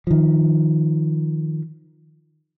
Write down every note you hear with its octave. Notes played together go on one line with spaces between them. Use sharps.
D#3 F3